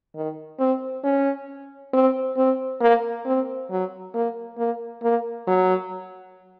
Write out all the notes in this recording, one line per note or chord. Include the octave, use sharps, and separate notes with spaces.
D#3
C4
C#4
C4
C4
A#3
C4
F#3
A#3
A#3
A#3
F#3